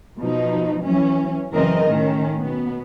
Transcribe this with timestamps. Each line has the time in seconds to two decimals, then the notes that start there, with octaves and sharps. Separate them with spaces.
0.18 B2 F3 D#4
0.83 E3 F#3 C#4
1.51 F#2 C#3 E3 C4 A#4 D#5
1.88 A2 D#3 C#4
2.40 B2 B3